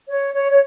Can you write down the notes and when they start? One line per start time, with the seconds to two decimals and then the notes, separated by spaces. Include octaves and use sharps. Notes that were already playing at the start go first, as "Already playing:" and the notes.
0.09 C#5
0.34 C#5
0.51 C#5